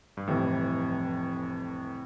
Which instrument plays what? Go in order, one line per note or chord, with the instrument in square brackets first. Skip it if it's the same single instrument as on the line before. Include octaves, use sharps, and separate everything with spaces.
[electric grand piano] G2
[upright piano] F1 F2 E3 G3 [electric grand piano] A2